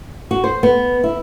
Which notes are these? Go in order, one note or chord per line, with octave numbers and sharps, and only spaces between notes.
F#4
C5
B3
E4